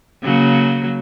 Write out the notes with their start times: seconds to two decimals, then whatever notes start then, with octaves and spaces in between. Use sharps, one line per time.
0.23 C#3 F#3 A#3